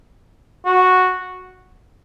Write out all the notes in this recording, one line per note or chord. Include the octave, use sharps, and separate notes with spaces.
F#4